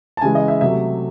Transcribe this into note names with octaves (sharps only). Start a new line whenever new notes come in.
A5
C#3 E3 G#3 G#5
D#5
E5
C3 F#3 A3 E5